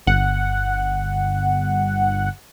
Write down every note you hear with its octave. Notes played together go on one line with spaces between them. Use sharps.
G1 F#5